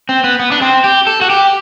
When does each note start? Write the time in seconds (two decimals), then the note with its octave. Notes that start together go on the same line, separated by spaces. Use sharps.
0.09 C4
0.24 B3
0.39 B3
0.52 D4
0.62 C4
0.84 G4
1.07 A4
1.21 F#4
1.30 G4